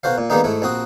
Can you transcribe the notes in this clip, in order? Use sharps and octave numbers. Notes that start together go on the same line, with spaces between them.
B1 F#4 C5 F5
A#2
D#3 G3 G#3 A#3 B3 D#4
G#2 A3 E4
A#1 C4 F#4 D#6